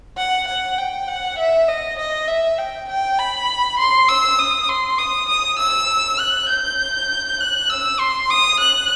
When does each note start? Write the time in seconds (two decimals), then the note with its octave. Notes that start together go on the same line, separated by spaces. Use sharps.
0.17 F#5
0.47 F#5
0.78 G5
1.08 F#5
1.38 E5
1.68 D#5
1.98 D#5
2.27 E5
2.58 G5
2.88 G5
3.18 B5
3.79 C6
4.09 E6
4.39 D#6
4.69 C6
4.98 D#6
5.28 D#6
5.59 E6
6.19 F#6
6.49 G6
7.40 F#6
7.69 E6
8.00 C6
8.30 D#6
8.60 F#6